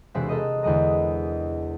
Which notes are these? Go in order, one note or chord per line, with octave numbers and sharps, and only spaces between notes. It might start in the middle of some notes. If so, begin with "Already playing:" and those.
E1 C3 G#3 C5 E5 F#6
A4 A#4 D#5
E2 D3 G#3 D#5 A#5